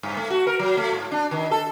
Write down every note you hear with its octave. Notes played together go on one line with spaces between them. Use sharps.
G2
A3
F#4
A#4
F#3
A3
G#2
D4
D#3
A4